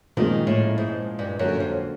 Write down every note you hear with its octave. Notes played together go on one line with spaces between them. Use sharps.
A#2 D#3 F3 G#3 C#4
A2
G#2
G2
F#2 D3 F#3 A#3
F2